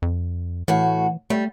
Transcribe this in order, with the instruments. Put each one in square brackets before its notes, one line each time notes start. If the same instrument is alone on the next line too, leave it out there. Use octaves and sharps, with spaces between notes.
[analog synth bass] F2
[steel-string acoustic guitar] A2 F#4 [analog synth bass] E3
[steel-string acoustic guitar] G3 [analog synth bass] A3